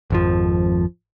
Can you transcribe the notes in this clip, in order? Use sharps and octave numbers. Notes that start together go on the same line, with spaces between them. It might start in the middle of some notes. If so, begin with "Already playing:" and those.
G#1 F2 F3